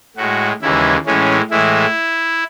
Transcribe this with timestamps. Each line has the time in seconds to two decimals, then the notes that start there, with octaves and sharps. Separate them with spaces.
0.16 A2 G#3 F#4
0.61 D#2 C#3 E3 G#3 E4
1.06 A2 E3 G#3 C#4
1.50 A2 E3 G#3 E4